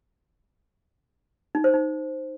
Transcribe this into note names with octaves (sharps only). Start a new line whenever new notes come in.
D#4
C5
D#4